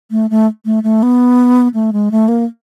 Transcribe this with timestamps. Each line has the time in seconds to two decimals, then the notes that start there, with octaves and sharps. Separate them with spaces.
0.11 A3
0.30 A3
0.65 A3
0.83 A3
1.03 B3
1.74 A3
1.93 G#3
2.11 A3
2.28 A#3